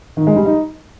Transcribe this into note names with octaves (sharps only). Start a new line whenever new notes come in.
D#3
G#3
G3
D#4